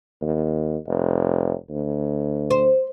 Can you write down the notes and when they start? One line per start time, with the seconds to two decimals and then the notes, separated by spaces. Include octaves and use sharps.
0.21 D#2
0.87 F1
1.69 D2
2.51 C5